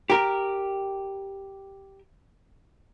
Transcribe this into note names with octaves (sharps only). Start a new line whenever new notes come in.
G4 A#4